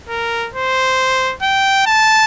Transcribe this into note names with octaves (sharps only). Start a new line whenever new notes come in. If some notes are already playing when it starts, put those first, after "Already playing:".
A#4
C5
G5
A5